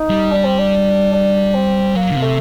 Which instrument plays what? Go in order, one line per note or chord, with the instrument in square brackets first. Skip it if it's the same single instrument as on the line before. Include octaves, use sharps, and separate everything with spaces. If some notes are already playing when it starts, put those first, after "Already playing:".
Already playing: [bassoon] D#4
[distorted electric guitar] G3
[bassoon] D4
C4
D4
D4
C4
[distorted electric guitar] F#3 [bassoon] A#3
[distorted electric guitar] D3
C3
[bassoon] A3